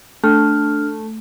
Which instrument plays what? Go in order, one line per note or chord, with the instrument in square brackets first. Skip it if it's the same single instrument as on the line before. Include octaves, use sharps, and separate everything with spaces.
[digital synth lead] A3 [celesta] D4 F6